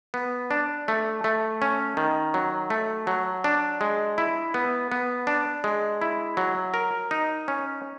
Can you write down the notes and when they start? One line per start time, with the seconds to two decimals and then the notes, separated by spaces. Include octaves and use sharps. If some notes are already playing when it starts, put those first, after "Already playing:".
0.14 B3
0.51 D4
0.88 A3
1.24 A3
1.62 C#4
1.97 D#3
2.34 F#3
2.70 A3
3.07 F#3
3.44 D4
3.81 G#3
4.18 E4
4.54 B3
4.92 B3
5.27 D4
5.64 G#3
6.02 E4
6.37 F#3
6.74 A#4
7.11 D#4
7.48 C#4